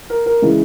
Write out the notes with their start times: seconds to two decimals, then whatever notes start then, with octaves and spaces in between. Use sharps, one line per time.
0.10 A#4
0.26 A#4
0.42 C#3 E3 G#3